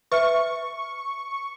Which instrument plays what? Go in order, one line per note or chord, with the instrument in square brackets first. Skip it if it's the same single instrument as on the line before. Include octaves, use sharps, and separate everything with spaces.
[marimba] B4 E5 F6 [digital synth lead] C#6